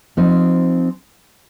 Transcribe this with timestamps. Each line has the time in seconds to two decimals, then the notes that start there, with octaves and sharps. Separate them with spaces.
0.17 F3 C4 D#4